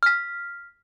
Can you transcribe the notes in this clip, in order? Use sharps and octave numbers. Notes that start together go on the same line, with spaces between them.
F6 B6